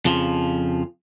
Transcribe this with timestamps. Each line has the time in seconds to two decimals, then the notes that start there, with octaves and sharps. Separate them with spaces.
0.05 F2 C#3 F3